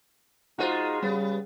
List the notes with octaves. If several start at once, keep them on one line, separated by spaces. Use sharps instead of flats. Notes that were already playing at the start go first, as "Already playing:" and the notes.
G#3 D#4 F4 F#4 C5
C#3 G3 B3